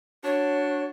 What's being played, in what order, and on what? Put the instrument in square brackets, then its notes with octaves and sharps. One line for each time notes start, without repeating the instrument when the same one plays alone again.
[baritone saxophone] D4 [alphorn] F#4 [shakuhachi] C#5